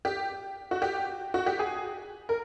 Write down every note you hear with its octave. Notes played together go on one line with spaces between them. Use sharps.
G4
F#4
G4
F#4
G4
G#4
A#4